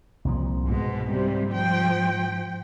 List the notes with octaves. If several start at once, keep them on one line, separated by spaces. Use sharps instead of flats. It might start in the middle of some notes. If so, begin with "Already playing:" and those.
C2 A#2 F3
G#2 B2 G#3
C3 G3
F3 G5